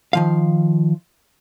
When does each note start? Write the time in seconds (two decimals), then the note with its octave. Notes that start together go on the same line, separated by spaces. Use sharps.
0.13 D#3 F3 F5